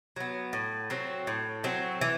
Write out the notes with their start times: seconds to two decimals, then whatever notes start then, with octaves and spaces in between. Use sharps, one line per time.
0.16 F#3 B3
0.53 A2
0.90 F#3 C4
1.27 A2
1.64 F#3 C4
2.01 E3